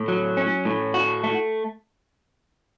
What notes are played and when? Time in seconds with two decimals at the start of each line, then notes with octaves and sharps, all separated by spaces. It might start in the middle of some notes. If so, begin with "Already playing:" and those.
Already playing: A2
0.08 F#3
0.37 C#4
0.65 A2
0.94 F#4
1.24 A3